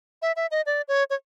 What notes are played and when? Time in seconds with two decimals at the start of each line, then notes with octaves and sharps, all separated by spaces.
0.22 E5
0.36 E5
0.51 D#5
0.66 D5
0.88 C#5
1.10 C#5